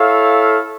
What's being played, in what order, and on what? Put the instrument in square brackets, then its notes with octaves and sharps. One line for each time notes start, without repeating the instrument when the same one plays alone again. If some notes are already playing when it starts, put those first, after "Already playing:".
Already playing: [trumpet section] E4 A4 C#5 F5